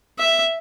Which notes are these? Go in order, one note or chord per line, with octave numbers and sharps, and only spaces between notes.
E5